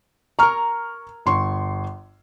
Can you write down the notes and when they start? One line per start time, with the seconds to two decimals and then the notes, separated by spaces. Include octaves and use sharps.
0.39 A#4 A#5 C#6 F6
1.26 G1 C6 C#6